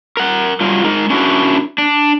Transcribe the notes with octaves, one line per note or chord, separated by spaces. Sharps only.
A#4 F#5
F#3 G3 F4
G#3 D#4 A#4
C#4 D4 E4 F#4 A#4
D4